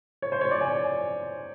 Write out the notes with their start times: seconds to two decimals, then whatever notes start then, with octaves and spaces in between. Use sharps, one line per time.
0.22 C#5
0.32 C5
0.41 C#5
0.51 D5
0.61 G#5